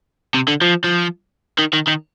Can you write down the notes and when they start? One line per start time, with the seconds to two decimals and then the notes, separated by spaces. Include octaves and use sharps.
0.34 C3
0.48 D3
0.61 F3
0.84 F3
1.58 D#3
1.73 D#3
1.87 D#3